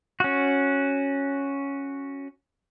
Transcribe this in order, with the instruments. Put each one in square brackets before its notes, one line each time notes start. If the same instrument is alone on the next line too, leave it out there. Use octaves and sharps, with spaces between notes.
[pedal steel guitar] C#4 F#4